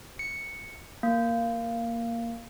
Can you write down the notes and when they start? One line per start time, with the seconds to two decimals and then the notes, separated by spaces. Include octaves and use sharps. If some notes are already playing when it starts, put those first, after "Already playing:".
0.19 C#7
1.03 A#3